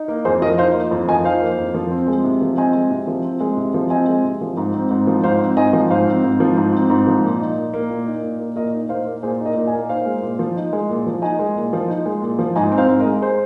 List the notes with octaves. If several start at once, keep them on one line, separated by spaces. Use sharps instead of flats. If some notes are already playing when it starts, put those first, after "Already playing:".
Already playing: D#4
A#3 A#4
F2 G#4 C5
F3 A#4 D#5
D#4 C5 F5
A#3
F2
F3 D#5 G#5
D#4 C5 F5
A#3
F2
F3
C4
G#3
C3
F3
C4 D#5 G#5
G#3
C3
F3
C4
G#3
C3
F3
C4 D#5 G#5
G#3
C3
F3
G#2
C4
G#2
F3
G#2 C5 F5
C4
G#2 D#5 G#5
F3
G#2 C5 F5
C4
G#2
F3
G#2
C4
G#2
F3
A#2
D#4
A#2
A#3
A#2
D#4
A#2
A#3
A#2 A#4 D#5
D#4
A#2 C5 F5
A#3
A#2 G#4 C5
D#4
A#4 D#5
A#2
D#5 G#5
A#3
D#4 C5 F5
G#3
A#2
F3
D#4
G#3
A#2
F3
D#4 D#5 G#5
G#3
A#2
F3
D#4
G#3
A#2
F3
G#2 D#5 G#5
C4
C5 F5
G#2
A#4 D#5
G#3
G#4 C5